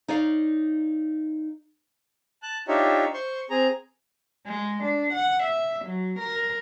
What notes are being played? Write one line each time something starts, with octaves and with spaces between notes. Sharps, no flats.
D#4 C#5 D5 F5
A5 F#6
D4 D#4 F4 G4 C#5 E5
C5 C6 C#6
C4 G#4 A#5
G#3
D4
F#5
E5
F#3
A#4